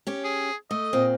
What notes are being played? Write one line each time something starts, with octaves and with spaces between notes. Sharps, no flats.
C#4 G4
G#4
A3 D#5
A#2 C4